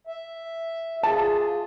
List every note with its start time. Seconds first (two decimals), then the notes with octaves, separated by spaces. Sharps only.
0.07 E5
1.03 F4 G#4 A5